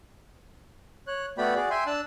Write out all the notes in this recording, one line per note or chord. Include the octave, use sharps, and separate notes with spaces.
C#5 F#6
A3 B3 F#4 D5 G5 B5
F#4 G#4 D5
E5 G5 G#5 C6
D4 A5 E6 F#6